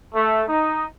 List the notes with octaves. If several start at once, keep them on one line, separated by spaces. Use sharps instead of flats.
A3
D#4